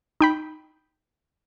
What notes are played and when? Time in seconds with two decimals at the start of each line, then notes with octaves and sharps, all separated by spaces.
0.21 D#4 G5 B5